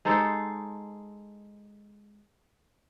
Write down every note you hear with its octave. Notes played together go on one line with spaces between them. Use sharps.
G#3 D#4 A4 C5